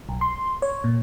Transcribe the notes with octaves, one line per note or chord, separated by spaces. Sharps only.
B1
C6
C#5
A#2